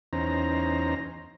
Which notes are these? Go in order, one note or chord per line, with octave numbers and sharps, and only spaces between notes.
E2 C#4 D#4 C5 A#5